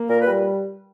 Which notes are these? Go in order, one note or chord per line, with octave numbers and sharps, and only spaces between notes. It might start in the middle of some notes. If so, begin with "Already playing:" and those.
Already playing: A#3
A#2 A#4
B4
G3